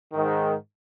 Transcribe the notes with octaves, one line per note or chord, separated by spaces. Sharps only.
G#2 D#3